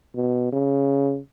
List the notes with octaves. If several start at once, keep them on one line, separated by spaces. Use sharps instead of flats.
B2
C#3